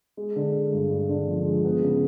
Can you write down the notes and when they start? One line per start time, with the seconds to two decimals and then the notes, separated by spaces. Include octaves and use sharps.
0.17 G#3
0.36 D3
0.53 G#3
0.72 G2
0.91 G2
1.09 D3
1.28 F3
1.45 G#3
1.64 B3
1.83 C#3